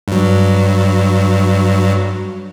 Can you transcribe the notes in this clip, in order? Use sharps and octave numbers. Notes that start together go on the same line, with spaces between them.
G2 F#3